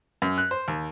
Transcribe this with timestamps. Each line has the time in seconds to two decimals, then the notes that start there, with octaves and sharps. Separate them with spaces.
0.22 F#2
0.38 F#6
0.51 C5
0.68 D#2